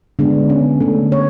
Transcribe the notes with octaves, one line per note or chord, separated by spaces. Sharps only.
D3 G#3 B3 D4
C#4
D3 A3 A4
C#5